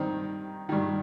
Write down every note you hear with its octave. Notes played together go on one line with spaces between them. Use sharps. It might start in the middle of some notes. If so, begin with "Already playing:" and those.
Already playing: G2 D#3 C4 D#4
G2 D#3